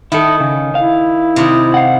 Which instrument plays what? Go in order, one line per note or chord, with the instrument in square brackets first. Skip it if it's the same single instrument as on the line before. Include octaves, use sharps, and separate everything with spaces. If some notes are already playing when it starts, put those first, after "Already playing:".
[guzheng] D#3 [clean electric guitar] E4 A4
[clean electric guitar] C#3
[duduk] E4 [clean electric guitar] F5
[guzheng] C3 D#3
[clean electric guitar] F5 F#5